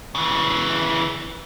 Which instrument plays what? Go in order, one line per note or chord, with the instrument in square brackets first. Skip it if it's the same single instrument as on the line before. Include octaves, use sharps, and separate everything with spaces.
[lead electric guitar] C#3 E3